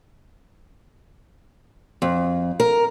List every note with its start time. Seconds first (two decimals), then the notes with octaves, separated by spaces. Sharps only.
2.02 F2
2.60 A#4